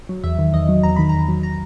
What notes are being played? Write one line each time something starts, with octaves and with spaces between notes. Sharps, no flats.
F#3
E2 E5
D#3
E2 D#5
F#3
E2 A#5
D#3 B5
E2 A#5
F#3
A#5